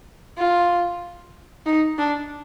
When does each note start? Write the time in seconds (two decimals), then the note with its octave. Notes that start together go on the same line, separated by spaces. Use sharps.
0.38 F4
1.66 D#4
1.98 D4